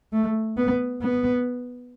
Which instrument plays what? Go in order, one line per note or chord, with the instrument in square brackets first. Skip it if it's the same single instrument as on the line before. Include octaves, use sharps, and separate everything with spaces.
[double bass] A3
B3
B3